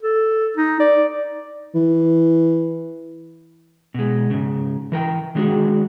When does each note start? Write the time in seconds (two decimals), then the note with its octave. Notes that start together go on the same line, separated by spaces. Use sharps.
0.02 A4
0.57 D#4
0.80 D5
1.75 E3
3.94 B2 G#3
4.30 G#2 C#3
4.92 E3 A#4 G5
5.35 D#3 F#3 G#3 D4 F#4 G#4